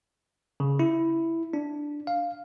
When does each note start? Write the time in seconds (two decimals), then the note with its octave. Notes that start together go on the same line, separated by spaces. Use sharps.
0.60 C#3
0.79 E4
1.53 D4
2.07 F5